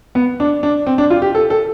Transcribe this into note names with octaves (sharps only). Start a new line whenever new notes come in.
B3
D4
D4
C4
D4
F4
G4
A4
A4